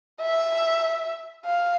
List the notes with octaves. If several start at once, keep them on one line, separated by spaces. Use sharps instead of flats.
E5
F5